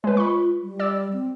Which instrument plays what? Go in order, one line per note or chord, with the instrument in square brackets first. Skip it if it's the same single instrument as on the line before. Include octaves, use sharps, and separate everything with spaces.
[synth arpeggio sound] G#3 B4 [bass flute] C#5
[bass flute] F4 [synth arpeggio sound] B5 C#6
[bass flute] G3
[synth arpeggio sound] D5 E6
[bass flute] C4